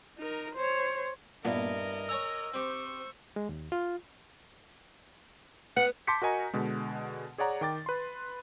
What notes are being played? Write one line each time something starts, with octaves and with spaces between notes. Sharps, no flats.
D#4 A#4
C5 C#5
G2 A#2 A#3 B3 E4 A#4 D#5
C#5 G#5 A#5 E6
C4 G4 C5 C#6
G#3
D#2
F4
B3 F#5
A5 C6 D6 G6 B6 C#7
F#4 A#4 D#5 G#5 A#5
B2 D3 G#3
G#4 C#5 D5 F#5 A#5
D#3 G5 D6 A6
B4 C6